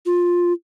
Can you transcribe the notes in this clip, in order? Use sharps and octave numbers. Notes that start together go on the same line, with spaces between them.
F4